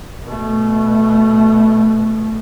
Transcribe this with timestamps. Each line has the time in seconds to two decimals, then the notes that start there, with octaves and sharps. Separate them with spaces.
0.25 B2 A3